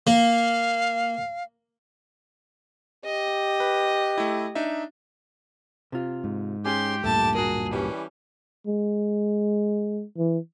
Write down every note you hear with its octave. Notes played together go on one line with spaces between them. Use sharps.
A#3 F5
G4 D#5
B4
A3 E4
D4 D#4 E5
C3 F4
G#2
C#4 G4 G#4 C6
D1 G2 A#2 A3 A5
F#4 G#4 A#4
E3 G3 C#4
G#3
E3